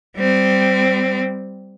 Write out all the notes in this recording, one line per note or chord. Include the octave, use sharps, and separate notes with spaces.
G3 C4